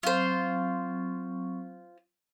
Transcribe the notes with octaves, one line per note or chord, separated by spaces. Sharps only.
F#3 C4 F4 C5 C#6